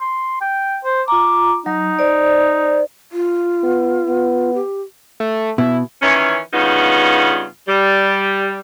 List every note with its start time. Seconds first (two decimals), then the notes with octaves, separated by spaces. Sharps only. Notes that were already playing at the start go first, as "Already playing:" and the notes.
0.01 C6
0.41 G5
0.84 C5
1.08 F4 A#5 D6
1.66 F#3 D#4
1.99 C5 D5
3.12 F4
3.63 B3
4.07 B3
4.54 G4
5.20 A3
5.58 B2 E4
6.02 D#3 E3 C#4
6.53 G2 C#3 B3 D#4 F4
7.68 G3